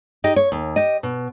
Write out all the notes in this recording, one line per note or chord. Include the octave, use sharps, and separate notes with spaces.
D#4 G4 D#5
C#5
D#2
G4 D#5
B2